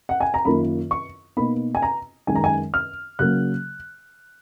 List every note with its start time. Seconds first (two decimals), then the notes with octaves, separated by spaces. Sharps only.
0.09 F#5
0.21 G#5
0.34 A#5
0.45 F#2 D#3 A#3 F4 B5
0.91 C#6
1.37 B2 A#3 D#4 B5
1.75 G#5
1.82 A#5
2.27 F#2 D#3 G#3 G#5
2.35 A#5
2.44 G#5
2.74 F6
3.19 C#3 F#3 A#3 F#6